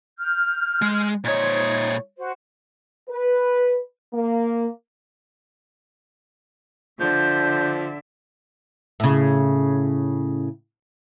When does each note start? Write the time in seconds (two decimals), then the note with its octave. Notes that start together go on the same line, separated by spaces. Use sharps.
0.19 F6 G6
0.82 G#3
1.24 A#2 D#4 C5 C#5 G#6
2.19 F#4 C5
3.09 B4
4.13 A#3
7.00 D3 F3 E5 G6
9.00 A2 C#3